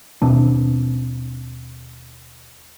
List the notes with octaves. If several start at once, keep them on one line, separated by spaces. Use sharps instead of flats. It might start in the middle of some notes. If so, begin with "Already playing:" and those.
D#2 B2 C4 D4